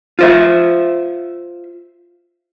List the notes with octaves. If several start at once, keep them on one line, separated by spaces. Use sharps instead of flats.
F4 C5 E5